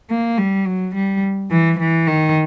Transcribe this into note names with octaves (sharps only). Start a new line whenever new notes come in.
A#3
G3
F#3
G3
E3
E3
D#3